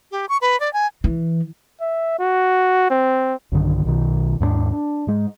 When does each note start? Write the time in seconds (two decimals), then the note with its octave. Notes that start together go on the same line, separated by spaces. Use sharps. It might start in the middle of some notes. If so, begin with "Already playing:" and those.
0.11 G4
0.29 C#6
0.41 B4
0.60 D5
0.73 G#5
1.04 E3
1.81 E5
2.19 F#4
2.90 C4
3.52 B1 G2 D3 D#3
3.85 B1 B2 D#3
4.40 D#2 G#2 G#3 D4
4.72 D4
5.07 G#2 G#3